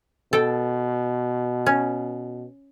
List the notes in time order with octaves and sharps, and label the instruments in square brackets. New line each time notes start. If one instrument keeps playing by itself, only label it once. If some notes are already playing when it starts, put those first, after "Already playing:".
[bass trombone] B2 [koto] A4 G5
[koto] C#4